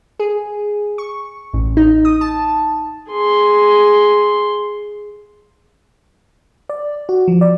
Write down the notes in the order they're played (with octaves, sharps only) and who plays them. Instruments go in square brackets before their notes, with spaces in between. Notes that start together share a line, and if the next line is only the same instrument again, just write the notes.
[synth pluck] G#4
C#6
A1
D#4
D#6
A5
[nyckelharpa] G#4 C6
[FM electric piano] D5
F#4
F3
D5